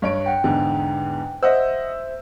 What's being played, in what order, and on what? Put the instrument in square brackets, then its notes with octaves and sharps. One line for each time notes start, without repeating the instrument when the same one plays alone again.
[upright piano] G2 C#5 D7
[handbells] F#5 G5
[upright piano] E2 G#2 D3
[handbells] C5 E5 [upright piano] D#5 F#5 E6